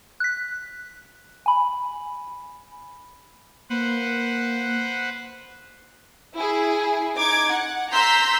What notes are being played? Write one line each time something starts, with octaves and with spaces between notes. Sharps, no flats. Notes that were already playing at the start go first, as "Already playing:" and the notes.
F#6 B6
G#5 B5
A#3 B4 C5 F#5
E4 G#4
D#4 D6 G#6
F#5
A#5 C6 E6 G6 B6